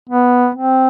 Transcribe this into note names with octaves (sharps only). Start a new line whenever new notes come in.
B3
C4